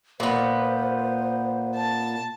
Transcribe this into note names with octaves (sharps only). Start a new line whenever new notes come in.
A#2 B3 C5
A5